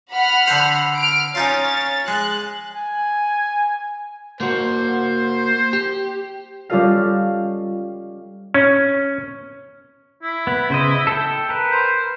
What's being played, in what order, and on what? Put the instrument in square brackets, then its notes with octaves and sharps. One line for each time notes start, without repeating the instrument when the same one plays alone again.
[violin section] F#5 B5 F6
[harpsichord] D3 C5
[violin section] F6 D7
[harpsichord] C#4 D#4 F4 [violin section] C#5 A6
[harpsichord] G#3 [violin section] F#6
[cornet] G#5
[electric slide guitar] A#3 F#4 [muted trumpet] C5
[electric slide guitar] G4
[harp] G3 C#4 F4 A4 D#5 F5
[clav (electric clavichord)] C#4
[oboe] E4
[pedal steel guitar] B3
C#3 C5 D#5
A4 G5
A#4 B4
[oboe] C5